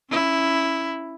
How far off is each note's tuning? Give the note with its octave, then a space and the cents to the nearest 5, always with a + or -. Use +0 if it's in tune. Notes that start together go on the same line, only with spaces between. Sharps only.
C#4 +0 E4 +0